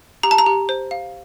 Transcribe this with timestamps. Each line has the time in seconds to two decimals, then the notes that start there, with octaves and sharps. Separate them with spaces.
0.23 G4 A#5
0.31 A5
0.38 A#5
0.46 G4
0.69 C5
0.91 F5